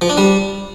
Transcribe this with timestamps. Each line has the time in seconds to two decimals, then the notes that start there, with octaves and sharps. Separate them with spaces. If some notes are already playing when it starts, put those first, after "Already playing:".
0.01 F3
0.09 D4
0.17 G3